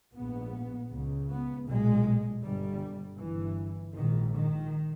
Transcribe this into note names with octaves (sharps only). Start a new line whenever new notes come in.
A#1 G#2 B3
C#2 C#3
B3
B1 A#2 G#3
G1 G2 G3
G1 G2 E3
A#1 G#2 D#3
D#3